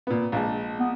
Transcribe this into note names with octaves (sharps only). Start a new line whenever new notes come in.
A#2 B3
A#1 G#3 A5
B3